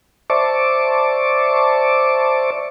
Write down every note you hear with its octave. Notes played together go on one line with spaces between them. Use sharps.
C5 D5 E5 A5 C#6 D6